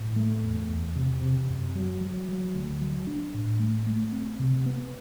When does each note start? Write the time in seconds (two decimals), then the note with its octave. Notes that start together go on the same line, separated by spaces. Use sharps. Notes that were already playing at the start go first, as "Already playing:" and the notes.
Already playing: A2
0.16 A3
0.43 E2
0.69 E2
0.96 C3
1.22 C3
1.49 F#2
1.75 F#3
2.01 F#3
2.28 F#3
2.55 D2
2.81 F#3
3.07 D4
3.34 A2
3.60 A3
3.86 A3
4.12 C4
4.39 C3
4.66 B3